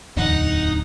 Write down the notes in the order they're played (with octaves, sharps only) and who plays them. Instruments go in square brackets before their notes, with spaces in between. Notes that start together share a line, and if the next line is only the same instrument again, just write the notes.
[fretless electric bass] D1 [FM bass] E2 [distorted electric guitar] D#4 [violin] F#5